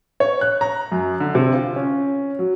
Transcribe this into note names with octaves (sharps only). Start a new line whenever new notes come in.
C#5
F#6
A#5
F#2
D3
C3
F4
C#4
F#3